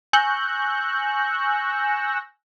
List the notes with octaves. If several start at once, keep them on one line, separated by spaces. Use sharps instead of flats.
G#5 C#6 E6 F#6 G6 A#6